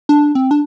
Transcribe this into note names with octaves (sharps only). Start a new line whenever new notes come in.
D4
C4
D4